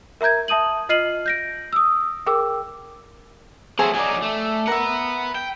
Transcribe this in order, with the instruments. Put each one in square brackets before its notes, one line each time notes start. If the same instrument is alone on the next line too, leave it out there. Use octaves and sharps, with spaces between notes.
[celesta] A#4 E5 A#5 G6 G#6
E5 A5 D#6 D#7 F#7
F4 D#5 F6 C7 D#7 F#7
G6 A#6 D7
D#6 E6
G#4 A#4 G5 D6 E6
[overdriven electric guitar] F#3 A3 [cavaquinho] G#4 C5 E5
[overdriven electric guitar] F#3 D#4 [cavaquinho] D5 G#5
[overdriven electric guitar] A3
[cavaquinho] A#4 E5 [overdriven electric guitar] B4 F#5
[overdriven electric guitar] G5